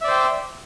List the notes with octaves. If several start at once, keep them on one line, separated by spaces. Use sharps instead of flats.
C5 D5 E5 G5